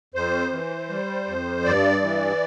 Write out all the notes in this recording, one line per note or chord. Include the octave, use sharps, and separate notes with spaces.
F2 C5
E3
G3
F2
G2 D5
E3